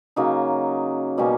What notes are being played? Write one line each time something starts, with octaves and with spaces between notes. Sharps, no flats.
C#3 F#3 A#3 D#4
B2 G3 A#3 C#4